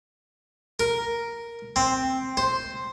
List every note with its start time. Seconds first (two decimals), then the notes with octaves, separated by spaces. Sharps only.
0.80 A#4
1.76 C4
2.37 C5